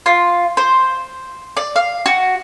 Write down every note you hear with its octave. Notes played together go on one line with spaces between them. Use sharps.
F4
C5
D5
F5
F#4